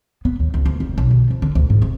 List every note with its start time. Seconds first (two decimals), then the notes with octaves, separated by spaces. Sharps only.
0.25 B3
0.40 D#2
0.54 C#2
0.66 D2
0.80 F1
0.98 B1
1.11 D3
1.30 F2
1.42 D3
1.55 D2
1.70 G#2
1.82 F1